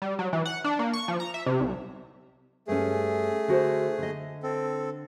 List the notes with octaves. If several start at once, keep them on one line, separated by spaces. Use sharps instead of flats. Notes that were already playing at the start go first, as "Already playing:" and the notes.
G3
F#3
E3
F#5
D4
A#3
C#6
F3
A#5
E5
C3
C2
G2 A3 C#4 G#4
D3 F#4 C5
D3 D#5
C4 A4